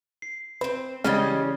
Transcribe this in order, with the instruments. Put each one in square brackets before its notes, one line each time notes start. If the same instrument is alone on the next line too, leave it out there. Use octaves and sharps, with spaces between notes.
[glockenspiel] C7
[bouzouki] C4 C5 [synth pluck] B4
[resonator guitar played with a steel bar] C#3 C#4 [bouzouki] E3 G3 D#5 [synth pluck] G#3 [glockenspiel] F6 A6